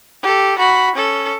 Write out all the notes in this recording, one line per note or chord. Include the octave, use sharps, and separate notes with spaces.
G4 A4
F#4 B5
C#4 A4